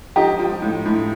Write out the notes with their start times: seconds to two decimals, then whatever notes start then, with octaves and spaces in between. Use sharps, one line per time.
0.16 F3 D#4 G4
0.39 F3
0.62 A2
0.86 A2